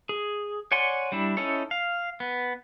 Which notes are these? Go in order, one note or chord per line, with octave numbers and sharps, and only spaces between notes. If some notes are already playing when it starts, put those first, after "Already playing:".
G#4
C#5 D5 F#5 G#5 C6
G3 D4 E4
C#4 D#4 E4 A4 C#5
F5
B3